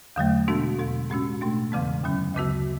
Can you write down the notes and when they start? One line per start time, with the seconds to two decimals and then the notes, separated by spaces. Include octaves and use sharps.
0.16 E2 D3 F#3 A3
0.48 B2 G#3 B3 D4 F#4
0.79 E2 B2 G#3
1.10 A2 G#3 C#4 F#4
1.41 B2 A3 D4
1.72 E2 C#3 E3 G#3 B3
2.04 F#2 D3 F#3 C#4
2.34 D2 C#3 F#3 B3 F#4